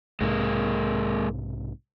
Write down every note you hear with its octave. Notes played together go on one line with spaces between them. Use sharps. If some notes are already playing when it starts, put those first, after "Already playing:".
B1 G#2 C3 G#3 A#3